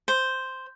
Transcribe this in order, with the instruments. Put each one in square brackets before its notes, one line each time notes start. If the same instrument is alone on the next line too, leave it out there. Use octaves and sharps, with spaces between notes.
[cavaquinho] C5